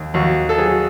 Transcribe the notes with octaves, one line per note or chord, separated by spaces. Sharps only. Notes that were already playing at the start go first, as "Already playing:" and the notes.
Already playing: D#2
D#2 F#4
A4
F#3 G#4